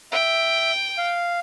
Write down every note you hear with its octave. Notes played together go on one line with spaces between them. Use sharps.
E5 G5
F5